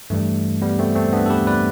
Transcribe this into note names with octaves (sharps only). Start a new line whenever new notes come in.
G2 E3 G3 A3
G3 B3
A3 C4
A3 C4
B3 D4
A4
G4 B4
B4 D5